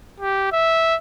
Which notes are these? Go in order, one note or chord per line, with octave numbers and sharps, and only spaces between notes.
G4
E5